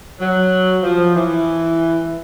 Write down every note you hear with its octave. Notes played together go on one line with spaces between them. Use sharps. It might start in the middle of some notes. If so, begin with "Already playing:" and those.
F#3
F3
E3